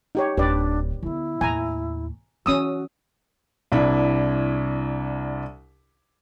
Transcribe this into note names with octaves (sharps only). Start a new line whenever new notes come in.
D#4 G4 C#5
D1 D4 G4 B4 D5
D3 B3 E4
D#2 A2 G#5 A#5
E3 C#4 D4 F#4 D#6 E6
C2 D4 E4